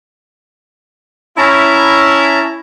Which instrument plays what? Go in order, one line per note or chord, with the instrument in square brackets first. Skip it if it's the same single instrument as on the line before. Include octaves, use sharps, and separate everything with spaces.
[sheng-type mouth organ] C#4 A5 A#5 [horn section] E4